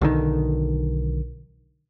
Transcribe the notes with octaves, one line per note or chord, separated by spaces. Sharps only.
B1 D3 D#3